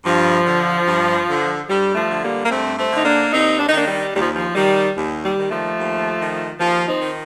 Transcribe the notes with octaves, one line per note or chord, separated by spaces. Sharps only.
G2 F3
D3
G2
D3
G2 G3
F3 A3
D3
G3 A#3
A#3
G2 A3 C4
A3 C4
D3 D#4
A#3 D4
D#2 C4 D#4
D4
D#4
D#3 A#3 D4
G3
D#2 G3
F3
F3
D#3 G3
D#2
G3
D#3
F3 A3
D#2
D#3
D#2 F3
C4 D#4
D#3